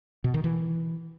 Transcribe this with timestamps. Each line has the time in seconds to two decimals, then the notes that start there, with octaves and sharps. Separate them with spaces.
0.24 B2
0.34 D#3
0.44 E3